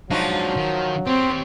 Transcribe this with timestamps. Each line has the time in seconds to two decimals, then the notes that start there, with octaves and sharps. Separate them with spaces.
0.10 F3 F#3 G#3 D4 D#4 F#4
0.57 D#3
1.07 C4 G4 C#5